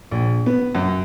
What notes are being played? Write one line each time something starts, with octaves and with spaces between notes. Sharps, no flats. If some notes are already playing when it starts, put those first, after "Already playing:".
A#1
B3
F#2